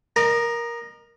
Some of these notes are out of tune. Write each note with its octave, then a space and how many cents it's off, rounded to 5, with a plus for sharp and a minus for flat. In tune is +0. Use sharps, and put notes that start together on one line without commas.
A#4 +10 D#5 -30